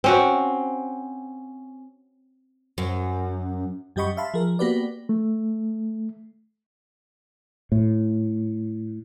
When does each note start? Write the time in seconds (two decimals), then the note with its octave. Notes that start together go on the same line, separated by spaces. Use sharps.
0.04 C4 C#4 F#4
2.78 F#2
3.96 F#2 G3 G4 D#5 B5 C#6
4.17 E5 F5 A5 B5 C6
4.34 F3 G#4 A#4
4.59 A#3 B3 F#4 G4 B4 D5
5.09 A3
7.72 A2